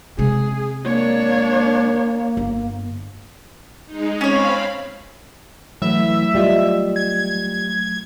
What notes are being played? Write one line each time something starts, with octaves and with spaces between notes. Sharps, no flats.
C3 G#3 G#4
A#3 D4 C#5
G1
G#3 D#4
C4 C#4 C#5 F5 B5
E3 F#3 A3 E5
G3 F4 D#5
G#6